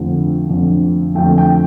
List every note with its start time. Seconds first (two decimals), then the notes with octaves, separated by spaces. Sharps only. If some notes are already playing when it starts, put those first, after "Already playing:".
Already playing: F2 D3 F3 A3
0.47 F2 D3 A3
1.15 F2 D3 A3 G5
1.38 G5